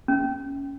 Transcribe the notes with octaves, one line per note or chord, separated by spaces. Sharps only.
C#4